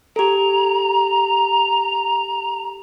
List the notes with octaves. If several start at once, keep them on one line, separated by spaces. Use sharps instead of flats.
G4 A4 A#5